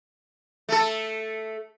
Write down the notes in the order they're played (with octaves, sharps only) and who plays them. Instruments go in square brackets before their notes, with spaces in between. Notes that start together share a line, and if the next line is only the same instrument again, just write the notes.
[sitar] A3 A4